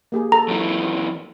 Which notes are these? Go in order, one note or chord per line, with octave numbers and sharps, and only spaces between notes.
A#3 G4 G#4
A4 A#5
F#2 E3 F#4